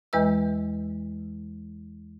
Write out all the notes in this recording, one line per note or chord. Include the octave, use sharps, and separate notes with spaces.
E2 E3 G#3 B4 D#5 E6